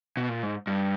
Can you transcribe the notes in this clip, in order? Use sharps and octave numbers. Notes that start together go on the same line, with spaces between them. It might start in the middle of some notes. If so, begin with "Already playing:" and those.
B2
A#2
G#2
G2